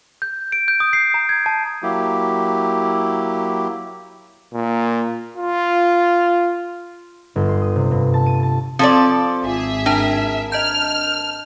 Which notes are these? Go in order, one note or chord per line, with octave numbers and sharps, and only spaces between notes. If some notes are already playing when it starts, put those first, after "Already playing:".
G6
D7
G6
D#6
C7
A#5
G#6
A5
F#3 A#3 E4 G4
A#2
F4
G1
C6
D#6
C3
G2
A5
D#7
A5
F3 C4 A4 D5
G#1 G#4 E5
D4 A#4 A5
D#5 A5 F6 G6